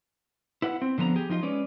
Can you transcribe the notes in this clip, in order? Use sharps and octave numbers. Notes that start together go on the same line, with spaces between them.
E4 B4 F#5
C4
D3 F3 B3 G#5 A#5
G4 G#4
F3 D#4 F4 D#5
G#3 C#4 B4 D5